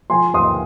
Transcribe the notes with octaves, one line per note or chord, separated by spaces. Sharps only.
F3 G#5 C6
D#2 C6 D#6